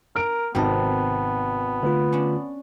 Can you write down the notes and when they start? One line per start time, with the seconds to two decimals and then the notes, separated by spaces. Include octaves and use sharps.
0.16 A#4 F6 D7
0.55 G#1 C3 D#3 B3 A#4 G5 A5
1.83 D3 A3 F4 B4
2.12 C#4 D4